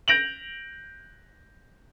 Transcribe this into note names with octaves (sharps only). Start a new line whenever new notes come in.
G6 A#6 D7 F7 F#7